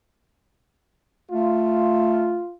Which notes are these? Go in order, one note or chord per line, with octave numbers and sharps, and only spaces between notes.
A3 F4